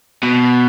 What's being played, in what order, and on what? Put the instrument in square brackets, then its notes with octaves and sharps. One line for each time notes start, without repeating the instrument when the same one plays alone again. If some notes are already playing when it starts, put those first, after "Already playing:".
[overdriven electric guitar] B2